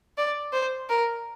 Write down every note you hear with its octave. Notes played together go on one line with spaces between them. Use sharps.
D5
C5
A#4